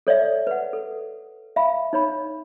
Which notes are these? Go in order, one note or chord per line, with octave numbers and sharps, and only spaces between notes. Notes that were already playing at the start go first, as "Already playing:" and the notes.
A4 C#5 D5 E5
B4 F#5
A4
E5 F5 B5
D#4 C#5 B5